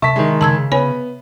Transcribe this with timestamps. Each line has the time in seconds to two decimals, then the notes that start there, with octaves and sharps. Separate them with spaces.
0.02 C3 E5 A5 B6
0.16 D#3 G#3
0.41 C#3 A5 E6 G#6
0.72 B3 C#5 G#5 B5